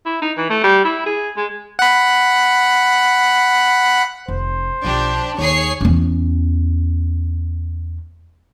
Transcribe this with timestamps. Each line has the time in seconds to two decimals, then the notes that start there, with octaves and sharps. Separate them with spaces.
0.05 E4
0.22 D#4
0.37 E3
0.50 A3
0.64 G3
0.84 E4
1.06 G#4
1.37 G#3
1.79 F#5 B5
4.28 F1 C5
4.84 B1 F3 D4 G4
5.38 D#2 G#4 C#5 C7
5.81 E2 C#4